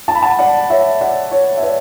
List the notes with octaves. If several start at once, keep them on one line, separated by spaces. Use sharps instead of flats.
A5
B5
F#5 A5
D5 F#5
C#5 E5
D5 F#5
C#5
E5
B4 D5